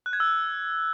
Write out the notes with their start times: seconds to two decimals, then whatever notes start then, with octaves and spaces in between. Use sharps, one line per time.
0.06 F#6
0.13 G#6
0.20 E6